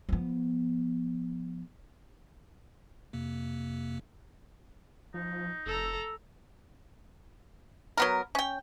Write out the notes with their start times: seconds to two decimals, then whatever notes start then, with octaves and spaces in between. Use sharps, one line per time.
0.09 F3 B3
3.13 F2 C3 A#3
5.14 F3 D#4
5.66 F1 A4 A#5 E6
7.97 F#3 B3 A#4
8.35 C#4 G5